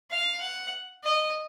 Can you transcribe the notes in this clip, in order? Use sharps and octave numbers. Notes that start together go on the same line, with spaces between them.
F5
F#5
D#5